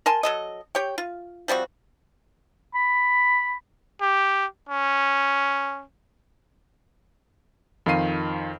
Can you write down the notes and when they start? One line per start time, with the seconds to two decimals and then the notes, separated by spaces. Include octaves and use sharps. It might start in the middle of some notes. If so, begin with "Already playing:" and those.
0.06 A#4 G#5 A5 C6
0.23 F#3 A4 D#5
0.75 G4 C#5 G5
0.98 F4
1.48 F3 G3 C4 F#4
2.75 B5
4.01 G4
4.69 C#4
7.86 F2 D#3 F4 F5 C7 D#7